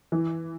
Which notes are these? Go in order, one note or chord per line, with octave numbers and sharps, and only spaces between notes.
E3